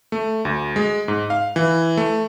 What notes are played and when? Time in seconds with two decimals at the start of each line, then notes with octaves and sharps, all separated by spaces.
0.12 A3
0.45 D2
0.76 G#3
1.08 G#2
1.30 F5
1.56 E3
1.97 A3